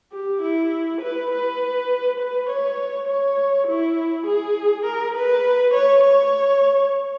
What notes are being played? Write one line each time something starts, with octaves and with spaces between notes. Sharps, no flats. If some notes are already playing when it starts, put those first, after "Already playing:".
G4
E4
B4
B4
B4
C#5
C#5
E4
G#4
A#4
B4
C#5
C#5